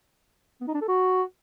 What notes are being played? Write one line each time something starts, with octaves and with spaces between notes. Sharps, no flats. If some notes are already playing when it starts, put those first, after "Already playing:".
B3
D#4
D4
A4
F#4